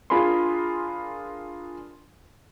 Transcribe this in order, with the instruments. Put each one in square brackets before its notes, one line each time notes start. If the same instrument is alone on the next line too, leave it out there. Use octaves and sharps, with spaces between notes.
[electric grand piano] D4 F4 G#4 A#4 B5 C6